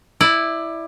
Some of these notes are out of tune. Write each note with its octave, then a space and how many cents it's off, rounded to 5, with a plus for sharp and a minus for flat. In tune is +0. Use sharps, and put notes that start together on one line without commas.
E4 +0 D5 +20